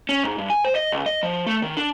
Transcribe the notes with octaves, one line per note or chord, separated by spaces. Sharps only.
C#4
G#2
G2
G#5
C5
D#5
C#2
D#5
F3
A3
D#3
D4